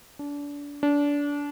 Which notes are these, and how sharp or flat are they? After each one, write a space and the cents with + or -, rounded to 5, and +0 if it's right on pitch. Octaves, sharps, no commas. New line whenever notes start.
D4 -30
D4 -25